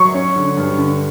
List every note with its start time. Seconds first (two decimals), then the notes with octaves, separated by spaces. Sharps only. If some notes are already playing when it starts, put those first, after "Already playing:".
Already playing: F#3 C#6
0.14 C#4
0.36 D3
0.57 G2
0.78 D3